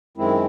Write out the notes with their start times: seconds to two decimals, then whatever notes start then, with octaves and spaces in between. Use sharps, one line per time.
0.17 F#2 D#3 G#3 C4 E4